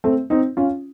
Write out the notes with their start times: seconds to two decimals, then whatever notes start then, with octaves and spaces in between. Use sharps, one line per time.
0.04 A3 C4
0.30 C4 D#4
0.57 C#4 F4